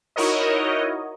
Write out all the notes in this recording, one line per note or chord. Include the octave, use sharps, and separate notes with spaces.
D#4 E4 F#4 A#4 C#5 D#5